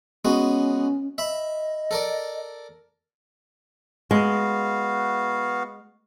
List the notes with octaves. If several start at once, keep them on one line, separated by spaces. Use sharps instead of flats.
G#3 B3 C#4 F#4
D#5 E5 B5
A4 A#4 D5
G#3 B3 F#4 F5